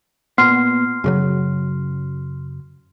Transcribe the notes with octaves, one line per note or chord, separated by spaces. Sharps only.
A#2 B3 C6 F6 C7
F#2 C#3 F#3